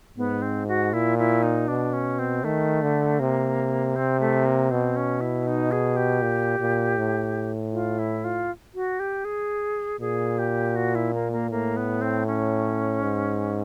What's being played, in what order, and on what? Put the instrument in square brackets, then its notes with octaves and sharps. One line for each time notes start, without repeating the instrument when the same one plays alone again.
[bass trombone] G#2 [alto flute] B3
[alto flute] C4
F#4
[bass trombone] A#2 [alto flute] E4
[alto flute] E4
D#4
[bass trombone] B2 [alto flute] D4
[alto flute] C#4
C4
[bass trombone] D#3 [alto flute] A3
[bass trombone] D3
[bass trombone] C3 [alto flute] A#3
[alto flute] C4
A3
A#3
[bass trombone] B2 [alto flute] C4
[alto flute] C#4
E4
D#4
G#4
G4
[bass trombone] A#2
A#2
A2
[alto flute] F4
E4
F4
F#4
G4
G#4
[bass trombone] A#2 [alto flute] G#4
[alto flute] G4
F#4
E4
A#3
A#3
[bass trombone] A2 [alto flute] A#3
[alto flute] B3
C4
C#4
[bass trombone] G#2